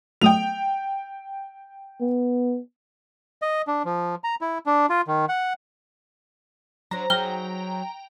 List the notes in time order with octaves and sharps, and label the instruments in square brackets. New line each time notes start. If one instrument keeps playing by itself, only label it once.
[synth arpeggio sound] F#3 A3 D#6 [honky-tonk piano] G5 F7
[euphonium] B3
[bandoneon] D#5
D4
F3
A#5
E4
D4
F4
D#3
F#5
[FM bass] F#3 [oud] D4 C5 [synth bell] A#5
[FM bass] F#3 [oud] D#4 G#4 [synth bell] G5 A#5 [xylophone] F6 G7